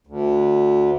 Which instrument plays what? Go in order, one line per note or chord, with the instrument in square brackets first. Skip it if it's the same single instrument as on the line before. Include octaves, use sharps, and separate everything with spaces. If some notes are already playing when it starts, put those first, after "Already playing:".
[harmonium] D2